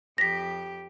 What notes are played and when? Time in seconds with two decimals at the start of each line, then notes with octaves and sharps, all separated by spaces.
0.18 F2 G4 A#6 B6